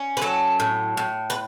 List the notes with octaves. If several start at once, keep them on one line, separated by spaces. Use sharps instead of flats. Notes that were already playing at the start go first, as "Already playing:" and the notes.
Already playing: C#4
B4
F#3 A4
A2
A2
B4